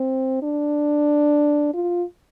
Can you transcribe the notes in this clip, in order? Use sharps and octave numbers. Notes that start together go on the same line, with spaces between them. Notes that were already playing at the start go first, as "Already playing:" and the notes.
Already playing: C4
D4
F4